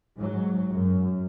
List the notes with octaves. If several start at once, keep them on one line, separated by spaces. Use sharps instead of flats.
G#2 F#3
F#2